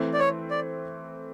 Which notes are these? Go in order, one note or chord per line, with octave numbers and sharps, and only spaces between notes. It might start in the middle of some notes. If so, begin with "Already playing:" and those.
Already playing: E3 A3 C4
D5
C#5
D5